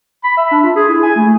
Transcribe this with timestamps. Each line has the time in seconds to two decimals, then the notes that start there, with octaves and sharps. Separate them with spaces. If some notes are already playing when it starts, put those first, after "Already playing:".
0.24 B5
0.37 E5
0.51 D4
0.63 F4
0.76 G#4
0.88 E4
1.03 G#5
1.16 A3